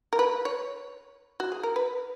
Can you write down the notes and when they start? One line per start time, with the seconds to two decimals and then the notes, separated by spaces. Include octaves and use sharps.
0.13 A#4
0.19 B4
0.45 C#5
1.40 F#4
1.52 G#4
1.63 A#4
1.76 B4